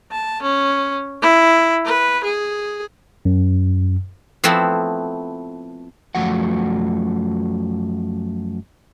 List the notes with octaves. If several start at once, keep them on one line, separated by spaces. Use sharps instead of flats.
A5
C#4
E4
B4
G#4
F#2
F3 A3 B3 C4 E4
F#2 F3 A3 F#4 F#5